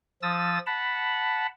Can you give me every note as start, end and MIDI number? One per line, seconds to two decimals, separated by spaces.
0.22 0.59 53
0.22 0.59 87
0.22 0.59 88
0.22 0.59 93
0.66 1.47 78
0.66 1.47 81
0.66 1.47 83